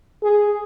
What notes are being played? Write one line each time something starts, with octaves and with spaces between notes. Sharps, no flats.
G#4